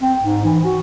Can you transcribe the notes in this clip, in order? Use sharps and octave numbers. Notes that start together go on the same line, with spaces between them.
C4
G#2
E3
F#4